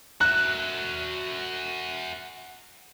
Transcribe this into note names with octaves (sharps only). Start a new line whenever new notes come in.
F#4 E5 F#6